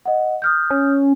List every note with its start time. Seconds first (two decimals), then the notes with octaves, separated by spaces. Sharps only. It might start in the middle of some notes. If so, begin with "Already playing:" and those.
0.06 D#5 F#5
0.42 D#6 F6 G6
0.70 C#4